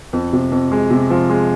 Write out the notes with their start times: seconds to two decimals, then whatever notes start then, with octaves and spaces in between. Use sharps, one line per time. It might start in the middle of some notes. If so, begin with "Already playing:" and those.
0.13 F2
0.33 C3
0.52 F2
0.71 G#3
0.90 C3
1.10 F3
1.29 G#3